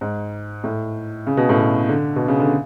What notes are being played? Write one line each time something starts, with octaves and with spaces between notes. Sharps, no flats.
G#2
A2
C#3
B2
A2
B2
D3
B2
C#3
D3